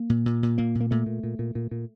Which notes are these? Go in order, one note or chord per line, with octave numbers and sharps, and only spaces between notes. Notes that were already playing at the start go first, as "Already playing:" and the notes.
Already playing: A#3
A#2
A#2
A#2
A#2 A#3
A#2
A#3
A#2 A3
A#2
A#2
A#2
A#2
A#2